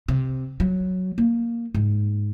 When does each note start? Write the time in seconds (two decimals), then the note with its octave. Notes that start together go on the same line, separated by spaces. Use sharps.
0.08 C3
0.60 F#3
1.18 A#3
1.75 G#2